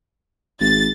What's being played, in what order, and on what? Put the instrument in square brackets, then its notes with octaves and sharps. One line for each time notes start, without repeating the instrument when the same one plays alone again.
[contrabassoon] G#1 [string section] A6